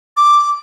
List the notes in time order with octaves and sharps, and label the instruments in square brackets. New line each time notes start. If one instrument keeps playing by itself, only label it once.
[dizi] D6